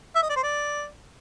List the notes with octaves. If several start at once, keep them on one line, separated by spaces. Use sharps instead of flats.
E5
D#5
D5
C5
D5